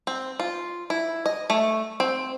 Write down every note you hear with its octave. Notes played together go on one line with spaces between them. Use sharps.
C4
F4
E4
D#5
A3
C4